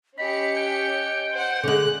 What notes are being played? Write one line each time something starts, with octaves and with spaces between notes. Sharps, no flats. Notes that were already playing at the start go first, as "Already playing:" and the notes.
C#4 G4 D#5 B5 C#7
G5
C5 F#5
D3 G#3 C#4 F#6